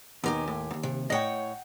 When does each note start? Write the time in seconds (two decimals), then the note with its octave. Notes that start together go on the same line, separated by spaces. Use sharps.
0.24 D#2 B2 D#4 G4 G#5
0.48 A2
0.71 D#2 G#2
0.83 C3
1.10 A2 C#5 D#5 F#5 G5